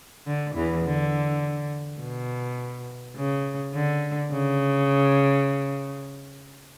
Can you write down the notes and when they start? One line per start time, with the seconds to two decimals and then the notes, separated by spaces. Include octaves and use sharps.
0.26 D3
0.54 E2 E3
0.84 D3
2.01 B2
3.16 C#3
3.74 D3
4.32 C#3